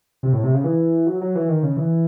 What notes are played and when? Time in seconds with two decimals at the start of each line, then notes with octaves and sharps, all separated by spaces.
0.23 C3
0.33 A2
0.43 C3
0.54 C#3
0.64 E3
1.07 F#3
1.21 F#3
1.35 E3
1.49 D#3
1.63 C#3
1.77 E3